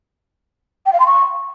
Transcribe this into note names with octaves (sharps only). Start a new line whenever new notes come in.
G5
F5
C6
C#6